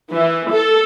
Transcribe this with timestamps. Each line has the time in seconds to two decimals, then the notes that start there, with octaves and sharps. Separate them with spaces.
0.11 E3
0.49 A4